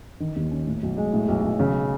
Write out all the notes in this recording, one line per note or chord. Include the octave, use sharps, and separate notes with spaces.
D#3
D#2
C#4
A2
B1
G#3
A2
B1
B1
C#3